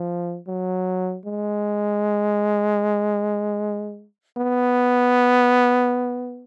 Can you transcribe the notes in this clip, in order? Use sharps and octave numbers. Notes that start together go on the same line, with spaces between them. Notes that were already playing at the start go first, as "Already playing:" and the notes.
Already playing: F3
F#3
G#3
B3